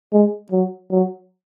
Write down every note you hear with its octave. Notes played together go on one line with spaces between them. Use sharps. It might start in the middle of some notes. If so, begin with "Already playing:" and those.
G#3
F#3
F#3